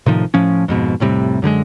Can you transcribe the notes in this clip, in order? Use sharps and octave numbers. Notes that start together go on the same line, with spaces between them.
A2 C3 D#3 F3
A2 F3 C#4
F2 G#2 B2
F1 A2 C3 G3
F#2 D3 G3 G#3